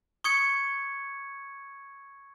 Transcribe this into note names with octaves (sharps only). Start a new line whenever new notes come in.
C#6 D#6 G#6 C#7